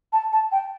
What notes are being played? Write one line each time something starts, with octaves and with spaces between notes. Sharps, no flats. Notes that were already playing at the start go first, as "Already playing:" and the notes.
A5
A5
G5